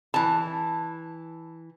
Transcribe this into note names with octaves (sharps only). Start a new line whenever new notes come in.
E3 A5